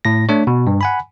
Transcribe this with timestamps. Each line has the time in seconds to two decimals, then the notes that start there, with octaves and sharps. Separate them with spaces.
0.05 A2 A#6
0.29 A3 D4 C#5
0.47 B2
0.67 G2
0.81 F#5 G#5 B5